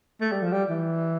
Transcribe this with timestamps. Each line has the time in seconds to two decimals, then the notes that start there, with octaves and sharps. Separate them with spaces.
0.21 A3
0.32 G3
0.42 F3
0.52 G3
0.70 E3